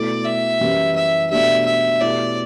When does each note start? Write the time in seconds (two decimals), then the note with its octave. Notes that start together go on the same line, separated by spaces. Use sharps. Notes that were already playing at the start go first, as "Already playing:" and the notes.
Already playing: B2 A3 E4 D5
0.25 E5
0.61 F#2 E3 G3
0.96 E5
1.31 B2 A3 D4 G4 E5
1.66 E5
2.01 B2 A3 E4 G4 D5